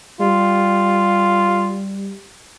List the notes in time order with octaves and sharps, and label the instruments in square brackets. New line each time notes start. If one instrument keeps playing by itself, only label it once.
[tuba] G3 [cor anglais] F4